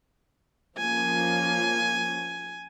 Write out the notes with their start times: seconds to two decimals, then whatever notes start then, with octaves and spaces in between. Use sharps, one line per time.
0.78 F3 A#3 C#4 G#5